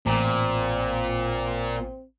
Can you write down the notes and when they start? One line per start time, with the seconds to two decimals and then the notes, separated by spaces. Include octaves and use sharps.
0.06 A1 A#2 C4